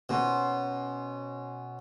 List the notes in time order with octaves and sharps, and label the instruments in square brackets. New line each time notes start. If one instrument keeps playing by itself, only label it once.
[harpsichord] B2 [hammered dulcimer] C#4 C5